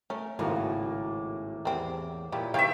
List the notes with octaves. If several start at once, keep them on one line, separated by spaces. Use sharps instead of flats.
A3 C#4 A#4
G#1 A2 C#3 A#3 F4 F#4
E2 G3 C4
A#2 F3 E4 G4 B5
C3 D#3 E3 C#5 E5 F5 G5